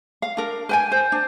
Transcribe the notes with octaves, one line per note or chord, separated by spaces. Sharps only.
F5
D4 A#4
B4 G5 G#5
C5
D4